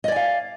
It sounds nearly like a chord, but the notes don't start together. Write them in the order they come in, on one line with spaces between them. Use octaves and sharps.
D#5 D5 G#5 F5